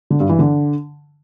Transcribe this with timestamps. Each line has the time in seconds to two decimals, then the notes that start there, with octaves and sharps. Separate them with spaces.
0.10 D3
0.20 G2
0.29 E3
0.39 D3